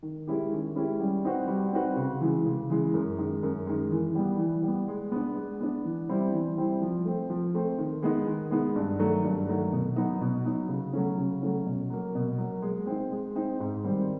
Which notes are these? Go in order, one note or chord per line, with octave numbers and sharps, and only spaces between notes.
D#3
G#3 C#4 E4 G4
D#3
G#3 C#4 E4 G4
G3
C4 D#4 F#4 B4
G3
C4 D#4 F#4 B4
C#3
E3 G#3
C#3
E3 G#3
F#2
D#3 G#3
F#2
D#3 G#3
E3
G3 B3
E3
G3 B3
G#3
B3 D4
G#3
B3 D4
E3
G3 C4 E4
E3
G3 C4 E4
F3
A3 C4
F3
A3 C4
D#3
G#3 B3 D#4
D#3
G#3 B3 D#4
G2
D#3 F#3 A3
G2
D#3 F#3 A3
B2
F#3 B3 D#4
B2
F#3 B3 D#4
C#3
F#3 A3 C#4
C#3
F#3 A3 C#4
B2
F#3 A#3
B2
F#3 A#3
G#3
C4 D#4
G#3
C4 D#4
G#2
D#3 G3 C4